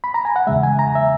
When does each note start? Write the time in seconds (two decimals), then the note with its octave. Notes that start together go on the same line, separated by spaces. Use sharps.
0.04 B5
0.14 A#5
0.25 G#5
0.36 F#5
0.47 E2 C#3 G#3 E5
0.63 G#5
0.79 A#5
0.95 E5